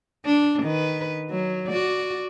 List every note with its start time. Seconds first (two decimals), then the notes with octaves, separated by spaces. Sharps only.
0.26 D4
0.63 D#3 B4
1.31 F#3
1.68 F#4 D5